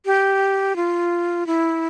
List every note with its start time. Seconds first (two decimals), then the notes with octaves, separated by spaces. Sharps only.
0.06 G4
0.76 F4
1.47 E4